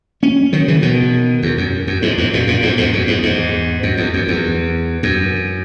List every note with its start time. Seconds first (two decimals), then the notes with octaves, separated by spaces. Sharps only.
0.23 A#3 C#4
0.53 D#3 F#3
0.68 C#3 E3
0.82 B2 D#3
1.42 E2
1.58 F#2
1.87 F#2
2.02 E2 G#2
2.18 E2 G#2
2.33 F#2 A#2
2.47 F#2 A#2
2.62 E2 G#2
2.77 E2 G#2
2.93 F#2
3.07 E2 G#2
3.23 E2 G#2
3.83 F#2
3.98 E2
4.14 F#2
4.28 E2
5.03 F#2